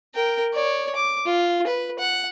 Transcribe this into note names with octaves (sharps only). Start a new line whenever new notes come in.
A#4 G5
C#5 D5
D6
F4
B4
F#5